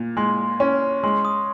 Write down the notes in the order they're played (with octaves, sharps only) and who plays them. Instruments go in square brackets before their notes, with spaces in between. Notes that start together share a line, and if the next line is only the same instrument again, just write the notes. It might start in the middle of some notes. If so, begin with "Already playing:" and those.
Already playing: [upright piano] A#2
[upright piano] G#3 [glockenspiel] C6
[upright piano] C#4
[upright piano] G#3 [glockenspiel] C6
[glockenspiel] D#6